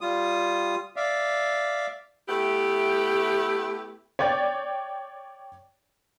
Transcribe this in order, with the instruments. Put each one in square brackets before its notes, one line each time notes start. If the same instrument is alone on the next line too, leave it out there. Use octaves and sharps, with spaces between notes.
[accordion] G3 F4 D#6
D5 E5 F5
[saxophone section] A3 B3 E4 G4
[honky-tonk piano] C#5 D5 G5 A6